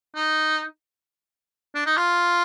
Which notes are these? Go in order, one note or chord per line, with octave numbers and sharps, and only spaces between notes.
D#4
D4
D#4
F4